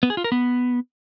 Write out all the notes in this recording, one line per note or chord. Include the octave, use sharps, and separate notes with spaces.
B3
G#4
F4
A#4
B3